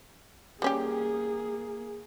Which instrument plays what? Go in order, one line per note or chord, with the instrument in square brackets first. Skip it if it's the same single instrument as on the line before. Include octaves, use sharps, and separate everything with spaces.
[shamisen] G3 C#4 G4 [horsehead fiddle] A#3 G#4